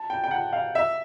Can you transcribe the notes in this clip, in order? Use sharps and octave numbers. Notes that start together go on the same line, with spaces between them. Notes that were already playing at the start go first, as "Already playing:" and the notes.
Already playing: A5
G5
G5
F#5
F5
E5